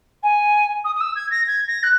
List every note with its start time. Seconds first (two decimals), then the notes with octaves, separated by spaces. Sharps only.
0.23 G#5
0.84 D#6
0.95 D#6
1.00 E6
1.15 G#6
1.31 A#6
1.47 G#6
1.67 A#6
1.83 F#6